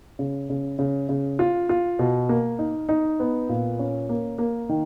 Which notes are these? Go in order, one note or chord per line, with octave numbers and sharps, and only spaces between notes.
C#3
C#3
C#3
C#3
F4
F4
B2
A#3
D#4
D#4
B3
A#2
C#4
A#3
A#3
D#3